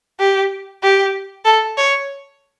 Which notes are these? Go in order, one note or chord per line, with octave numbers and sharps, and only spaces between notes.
G4
G4
A4
C#5